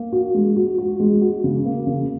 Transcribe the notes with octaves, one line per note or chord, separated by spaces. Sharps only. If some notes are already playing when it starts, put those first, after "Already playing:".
Already playing: A#3
F#4
G#3
F#4
F#4
G#3
F#4
C#3
A#3
C#3